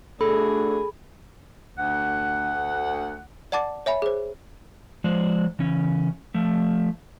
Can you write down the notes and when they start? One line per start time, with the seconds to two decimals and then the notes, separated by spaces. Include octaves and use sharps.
0.21 A3 D4 F#4 G#4 A4 B5
1.78 D2 F#5
3.52 D5 F#5 A5 D6 A6
3.86 C#5 E5 G#5 B5
4.02 G#4 C5
5.04 F3 G#3 C5 D5
5.59 C#3 E3 C#4
6.34 F3 A3